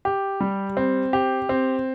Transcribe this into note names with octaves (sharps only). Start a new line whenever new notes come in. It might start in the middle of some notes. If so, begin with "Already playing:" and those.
G4
G3
C4
G4
C4